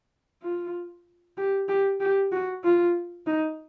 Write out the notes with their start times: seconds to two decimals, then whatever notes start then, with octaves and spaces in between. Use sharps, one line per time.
0.42 F4
1.38 G4
1.69 G4
2.00 G4
2.32 F#4
2.63 F4
3.27 D#4